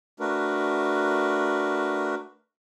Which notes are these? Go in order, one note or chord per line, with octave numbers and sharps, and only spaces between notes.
A3 D4 F#4 A#4 B4